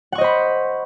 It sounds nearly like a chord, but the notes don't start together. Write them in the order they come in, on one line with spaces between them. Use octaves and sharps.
F#5 C#6 D#5 C5 B5